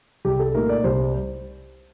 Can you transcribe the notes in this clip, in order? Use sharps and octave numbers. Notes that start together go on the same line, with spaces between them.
C2 G4
A4
A#2 A3 D#4 A#4
D5
C2 C5